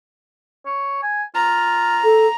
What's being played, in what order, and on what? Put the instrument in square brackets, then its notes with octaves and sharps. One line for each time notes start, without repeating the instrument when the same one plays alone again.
[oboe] C#5
G#5
[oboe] F4 [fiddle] A#5
[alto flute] A4